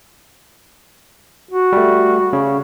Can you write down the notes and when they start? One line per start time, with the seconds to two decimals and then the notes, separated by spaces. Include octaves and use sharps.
1.51 F#4
1.73 G3 A3
2.33 C#3